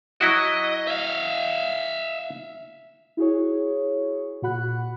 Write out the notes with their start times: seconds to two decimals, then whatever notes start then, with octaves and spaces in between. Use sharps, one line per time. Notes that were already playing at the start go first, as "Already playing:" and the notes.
0.21 F#3 E4 F#4 D#5
0.87 E5 F5
3.17 E4 F#4 G#4 C#5
4.42 A#2 F#4 F#5 B5 F#6